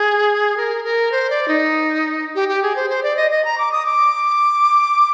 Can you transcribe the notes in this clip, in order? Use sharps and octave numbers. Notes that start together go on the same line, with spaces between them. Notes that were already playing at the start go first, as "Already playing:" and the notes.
Already playing: G#4
A#4
A#4
C5
D5
D#4
G4
G4
G#4
C5
C5
D5
D#5
D#5
A#5
D6
D#6
D6